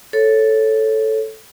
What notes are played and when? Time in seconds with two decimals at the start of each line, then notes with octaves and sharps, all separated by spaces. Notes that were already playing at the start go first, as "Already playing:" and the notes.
0.13 A4 C#5